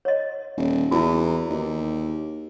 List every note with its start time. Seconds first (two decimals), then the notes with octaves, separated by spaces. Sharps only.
0.05 C#5 D#5
0.57 D#1
0.91 E2 E4 F#4
1.50 D#2